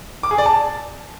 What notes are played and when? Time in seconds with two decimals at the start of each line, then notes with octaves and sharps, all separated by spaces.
0.23 D6
0.31 G#4
0.38 D5
0.46 A5